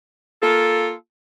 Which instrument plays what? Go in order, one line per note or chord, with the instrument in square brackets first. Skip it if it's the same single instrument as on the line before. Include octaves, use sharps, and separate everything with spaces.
[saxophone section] A#3 F4 A4